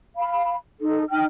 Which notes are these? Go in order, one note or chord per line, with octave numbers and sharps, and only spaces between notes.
F5 B5
D#4 A4
D#4 G5 F6